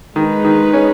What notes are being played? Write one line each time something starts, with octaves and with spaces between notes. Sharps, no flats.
D#3 G#3 D#4 G#4 B4
D#3
C#4